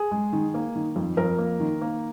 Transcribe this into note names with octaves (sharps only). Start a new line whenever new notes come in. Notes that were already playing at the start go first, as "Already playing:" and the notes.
Already playing: G#4
G#3
D#3
A#3
D#3
F2
F2 A#4
A#3
D#3
A#3